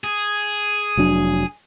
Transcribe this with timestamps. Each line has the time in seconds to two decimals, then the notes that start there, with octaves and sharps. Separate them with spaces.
0.04 G#4
0.97 F1 F#3 D4